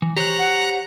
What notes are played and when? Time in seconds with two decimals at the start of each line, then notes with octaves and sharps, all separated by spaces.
0.02 E3
0.17 G4 C5 C#5 A#5 F#6
0.39 F#5